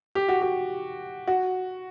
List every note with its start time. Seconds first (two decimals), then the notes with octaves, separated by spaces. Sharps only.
0.15 G4
0.28 F#4
0.42 G4
1.27 F#4